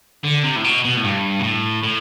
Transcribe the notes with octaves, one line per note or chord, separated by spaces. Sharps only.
D3
C3
A2
B2
B2
A2
G2
B2
A2
A2